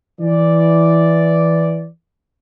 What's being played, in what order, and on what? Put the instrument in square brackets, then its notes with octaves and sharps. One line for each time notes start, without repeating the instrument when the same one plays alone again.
[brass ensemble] E3 D5